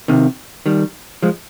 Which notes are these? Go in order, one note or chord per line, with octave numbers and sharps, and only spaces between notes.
C3 D#3
D#3 G3
F3 G#3